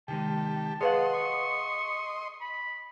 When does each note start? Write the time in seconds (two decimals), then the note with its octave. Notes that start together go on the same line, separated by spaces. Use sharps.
0.08 C3 D#3 G#3 G4 A5
0.81 G#4 B4 C#5 D#5 F5 F#5 C6
1.14 C#6
2.41 B5